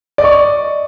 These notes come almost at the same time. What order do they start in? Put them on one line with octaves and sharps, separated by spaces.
D5 D#5 C#6